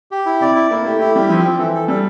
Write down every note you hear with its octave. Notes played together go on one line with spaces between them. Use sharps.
G4
E4
C3 D5
E4
A#3 E4
A3 G4
A3 E4
G3 G4
F3 C4
C4
E3 A4
A4
G3 A4